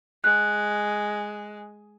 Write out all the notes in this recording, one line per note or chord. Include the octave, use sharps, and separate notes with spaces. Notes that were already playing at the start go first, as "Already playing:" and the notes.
G#3 F#6